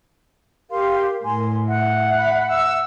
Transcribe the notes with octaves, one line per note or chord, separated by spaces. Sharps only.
G4 A#4 F5 C6
A2 G#5 C6
E5 F#5
B5
E6